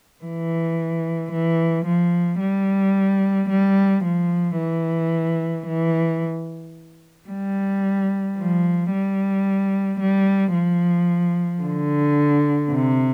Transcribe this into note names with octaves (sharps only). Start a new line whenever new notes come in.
E3
E3
F3
G3
G3
F3
E3
E3
G3
F3
G3
G3
F3
D3
C3